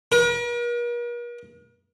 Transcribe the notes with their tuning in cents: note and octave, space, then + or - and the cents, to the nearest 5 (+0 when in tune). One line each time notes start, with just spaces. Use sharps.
A#4 +45